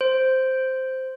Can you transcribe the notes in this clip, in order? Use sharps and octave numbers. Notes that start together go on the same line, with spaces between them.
C5